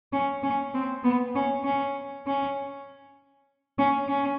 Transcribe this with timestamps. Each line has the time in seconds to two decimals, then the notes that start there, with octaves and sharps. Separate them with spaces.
0.13 C#4
0.43 C#4
0.74 C4
1.04 B3
1.35 C#4
1.64 C#4
2.27 C#4
3.78 C#4
4.08 C#4